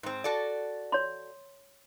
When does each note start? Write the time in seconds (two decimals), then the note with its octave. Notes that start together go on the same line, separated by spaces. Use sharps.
0.03 G#2 C4
0.24 F#4 A4 D5
0.92 C#5 C6